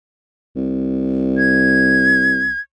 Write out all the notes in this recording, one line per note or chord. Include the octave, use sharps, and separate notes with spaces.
C2
G#6